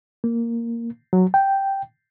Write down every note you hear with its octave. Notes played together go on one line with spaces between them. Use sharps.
A#3
F#3
G5